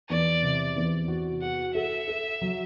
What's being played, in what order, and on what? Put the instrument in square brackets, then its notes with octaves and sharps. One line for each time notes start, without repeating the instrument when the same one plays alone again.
[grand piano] E2 [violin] D5
[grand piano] C3
E2
F#4
[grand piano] F#4 [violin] F#5
[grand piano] A4 [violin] E5
[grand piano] A4
F#3